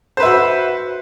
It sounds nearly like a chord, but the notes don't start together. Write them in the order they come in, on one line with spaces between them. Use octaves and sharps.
C5 B4 E5 F#4